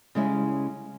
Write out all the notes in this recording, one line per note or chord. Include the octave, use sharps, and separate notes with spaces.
C#3 G3 G#3 C#4 E4